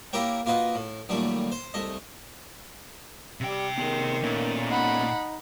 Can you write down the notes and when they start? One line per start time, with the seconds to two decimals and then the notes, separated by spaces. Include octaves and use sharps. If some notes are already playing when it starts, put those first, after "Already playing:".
0.13 A#3 E4 G4 A#4 C#5 G5
0.46 A#3 F4 F#4 B4 D#5
0.75 A2
1.09 F#2 A#2 D#3 G3 A3
1.52 C5
1.74 C2 A3 D#5
3.41 C3 G3 G5
3.78 D#3 B3 G4 G#4
4.24 A#2 A3 B3 C#4
4.70 D#4 F#5 B5